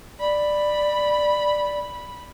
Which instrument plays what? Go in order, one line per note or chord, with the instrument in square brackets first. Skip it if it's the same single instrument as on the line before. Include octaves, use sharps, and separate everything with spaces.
[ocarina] D5 [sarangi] B5